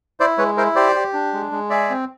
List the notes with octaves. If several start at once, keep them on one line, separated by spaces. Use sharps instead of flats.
E4 C5 D5
G#3 B4 C#5
E4 A#4 C5
G4 C5 D5
G4
D4
G#3
G#3
G#4 D5 E5
C4